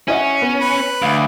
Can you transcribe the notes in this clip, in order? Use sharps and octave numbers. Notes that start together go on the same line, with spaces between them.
C#4 E4 D#5 F#5
B3
B4
D2 F5